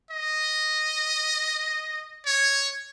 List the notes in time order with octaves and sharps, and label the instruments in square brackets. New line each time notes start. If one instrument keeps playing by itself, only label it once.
[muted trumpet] D#5
C#5